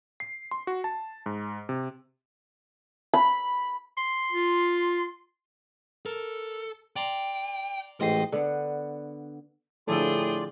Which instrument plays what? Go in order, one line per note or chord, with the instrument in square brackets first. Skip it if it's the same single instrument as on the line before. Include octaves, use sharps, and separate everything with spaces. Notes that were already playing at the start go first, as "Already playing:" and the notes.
[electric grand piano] C7
C6
F#4
A5
G#2
C3
[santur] B5
[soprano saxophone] C6
[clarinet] F4
[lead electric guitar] A4 [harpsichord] A#4
[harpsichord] D5 A#5 C6 [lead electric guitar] G5
[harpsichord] A1 G#2 D#6 [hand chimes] A3 G5 C7 [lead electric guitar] D#5
[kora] D3 B3 F#5
[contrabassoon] A2 [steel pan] D3 F3 A4 [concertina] F4 D5 [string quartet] G#4 G5